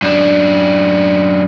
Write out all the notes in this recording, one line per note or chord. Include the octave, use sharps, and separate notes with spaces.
F#2 D4